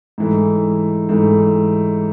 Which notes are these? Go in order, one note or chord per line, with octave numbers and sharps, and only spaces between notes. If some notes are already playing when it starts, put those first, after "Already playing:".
G#2 E3 A3
G#2 E3 A3